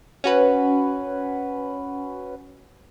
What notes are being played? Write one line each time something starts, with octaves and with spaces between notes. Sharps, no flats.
C#4 F#4 B4